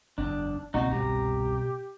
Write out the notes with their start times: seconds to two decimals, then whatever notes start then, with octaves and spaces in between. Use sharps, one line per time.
0.18 F#1 E2 D4
0.74 C#2 B2 A#3 C4 D#4 F#4
0.90 G1 C2 G4 A#5